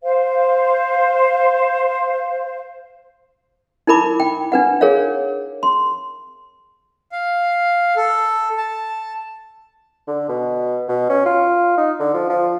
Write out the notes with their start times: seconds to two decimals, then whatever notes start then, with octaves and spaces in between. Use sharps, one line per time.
0.03 C5 F5
3.87 D#4 E4 A#4 B5 D6
4.20 G5
4.52 D4 B4 F#5
4.81 G#4 A#4 C#5 F5
5.63 C6
7.12 F5
7.96 A4
8.58 A5
10.08 D3
10.29 B2
10.88 B2
11.10 C#4
11.26 F4
11.77 D#4
12.00 D3
12.14 F3
12.30 F3